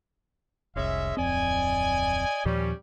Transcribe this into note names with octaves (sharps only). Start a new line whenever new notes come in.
F1 C2 G#3 C#4 E5
D1 F2 C4 D5 D#5 G#5
D#2 A#2 F3 G3 C#4